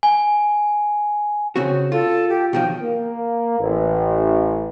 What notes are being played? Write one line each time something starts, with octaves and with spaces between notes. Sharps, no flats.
G#5
C#3 C4 F#4
F4 A4
G4
B2 D#3 F3 G5
A#3
A1